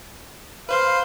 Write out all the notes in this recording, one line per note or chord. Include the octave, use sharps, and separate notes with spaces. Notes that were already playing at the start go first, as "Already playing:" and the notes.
B4 C5 F5 C6